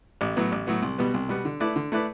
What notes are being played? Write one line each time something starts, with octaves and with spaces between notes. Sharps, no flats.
A1
A2 F#3 B3
A1
A2 F#3 B3
C2
B2 G3 B3
C2
B2 G3 B3
D3
A3 E4 B4 D5
D3
A3 E4 B4 D5